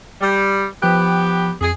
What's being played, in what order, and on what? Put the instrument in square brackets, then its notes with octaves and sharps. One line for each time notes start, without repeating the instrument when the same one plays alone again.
[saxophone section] G3
[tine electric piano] F3 G5 F#6 [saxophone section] B3 G4
[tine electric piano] F2 [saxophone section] G#4